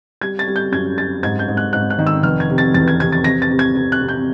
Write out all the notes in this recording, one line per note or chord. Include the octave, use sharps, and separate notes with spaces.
G3 G#6
A6
G3
G6
F#2 G#6
G3 A6
G#2 G#6
G6
G#2
F#6
G#2 F#6
F#6
D#3
E6
F1 F6
G#6
C3
A6
E2 A6
G#6
C3 G#6
A6
C3 A#6
A6
C3
G#6
C3
F#6
C3
G6